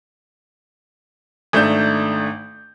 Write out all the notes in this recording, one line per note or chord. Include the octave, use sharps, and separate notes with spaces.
G#1 A3 D4 D#4 G6